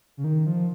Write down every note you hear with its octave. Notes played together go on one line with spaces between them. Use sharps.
C#3
D#3
F3